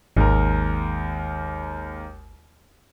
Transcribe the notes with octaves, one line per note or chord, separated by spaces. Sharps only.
G#1 D#2 G#3 A#4